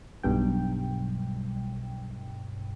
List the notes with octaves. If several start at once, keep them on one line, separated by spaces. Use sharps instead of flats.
B1 G2 G5